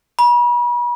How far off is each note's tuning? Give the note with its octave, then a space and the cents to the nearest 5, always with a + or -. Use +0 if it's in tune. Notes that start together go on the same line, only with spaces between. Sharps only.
B5 -40